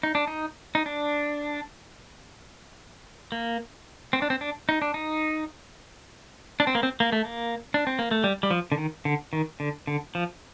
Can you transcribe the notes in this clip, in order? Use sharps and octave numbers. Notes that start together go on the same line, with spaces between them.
D#4
D4
D#4
D#4
D4
A#3
C4
D4
C4
D4
D#4
D4
D#4
D4
C4
A#3
C4
A#3
A3
A#3
D4
C4
A#3
A3
G3
G3
F3
D3
D#3
D3
D#3
D3
D3
F3